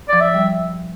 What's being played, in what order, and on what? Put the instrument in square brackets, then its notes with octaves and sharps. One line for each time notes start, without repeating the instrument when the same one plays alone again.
[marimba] F3 [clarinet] D5
[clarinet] E5
[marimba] G3